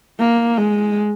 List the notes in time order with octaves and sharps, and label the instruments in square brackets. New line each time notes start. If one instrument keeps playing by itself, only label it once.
[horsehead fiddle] A#3
G#3